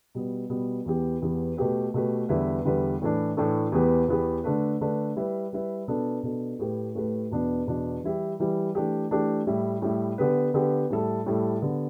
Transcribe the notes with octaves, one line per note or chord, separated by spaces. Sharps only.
B2 G3 B3
B2 G3 B3
E2 E3 B3 G4
E2 E3 B3 G4
B2 A3 G4 B4
B2 A3 G4 B4
E2 D3 G3 E4 B4
E2 D3 G3 E4 B4
A2 E3 A3 D4
A2 E3 A3 D4
E2 E3 B3 G4 B4
E2 E3 B3 G4 B4
D3 A3 D4 B4
D3 A3 D4 B4
G3 E4 B4
G3 E4 B4
B2 B3 D4 A4
B2 B3 D4 A4
A2 A3 G4 B4
A2 A3 G4 B4
E2 B2 B3 D4
E2 B2 B3 D4
E3 G3 E4 G4
E3 G3 E4 G4
E3 A3 D4 G4
E3 A3 D4 G4
A2 G3 E4
A2 G3 E4
D3 B3 G4 B4
D3 B3 G4 B4
A2 G3 E4 A4
A2 G3 E4 A4
D3 B3 G4